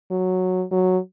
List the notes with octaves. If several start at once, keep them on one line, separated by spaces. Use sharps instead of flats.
F#3
F#3